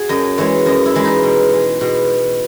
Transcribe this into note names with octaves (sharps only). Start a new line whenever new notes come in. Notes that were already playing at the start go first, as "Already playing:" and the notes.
Already playing: F#4 G#4
F#2 D#5
E3 G#3 C#5
F#2 D#5
E4
E3 G#3
D#4
B2
G#3
B2